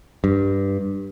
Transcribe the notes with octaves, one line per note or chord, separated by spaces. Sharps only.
G2